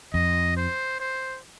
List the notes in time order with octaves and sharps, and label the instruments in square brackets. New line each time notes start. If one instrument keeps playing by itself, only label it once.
[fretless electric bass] F2 [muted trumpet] D#5
[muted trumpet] C5
C5